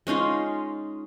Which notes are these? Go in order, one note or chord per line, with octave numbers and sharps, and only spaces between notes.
G#3 C#4 D#4 F4